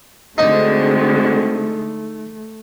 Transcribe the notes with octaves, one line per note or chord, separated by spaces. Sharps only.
D3 G#3 A3 C4 D#4 F#4